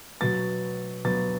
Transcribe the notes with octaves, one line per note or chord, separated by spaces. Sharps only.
B2 F#3 B3 A6
B2 F#3 B3 A6